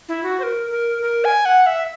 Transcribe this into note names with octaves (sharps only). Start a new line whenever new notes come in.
E4
F#4
C5
A#4
A#4
A#4
G#5
F#5
E5